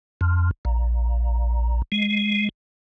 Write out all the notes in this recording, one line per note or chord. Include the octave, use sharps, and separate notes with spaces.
F2
A#1
G#3